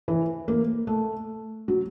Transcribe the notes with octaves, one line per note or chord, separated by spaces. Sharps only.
E3
A#3
A3
F#3